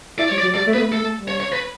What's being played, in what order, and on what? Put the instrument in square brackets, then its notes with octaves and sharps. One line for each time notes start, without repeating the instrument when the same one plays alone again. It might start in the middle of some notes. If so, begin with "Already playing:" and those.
[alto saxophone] E4 [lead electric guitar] D5
[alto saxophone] G3 [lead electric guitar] C#5
[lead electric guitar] D5
[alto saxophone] F#3
[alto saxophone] G3 [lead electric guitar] D5
[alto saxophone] A3
[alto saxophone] B3 [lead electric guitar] B4
[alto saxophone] A3
[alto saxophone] A3 [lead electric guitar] A4
[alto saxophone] A3
G3
[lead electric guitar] C#5
C#5
B4